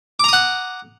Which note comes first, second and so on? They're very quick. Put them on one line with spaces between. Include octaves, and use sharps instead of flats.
D6 A#5 D#6 F#5